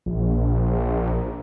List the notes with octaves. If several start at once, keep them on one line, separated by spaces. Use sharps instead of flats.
A#1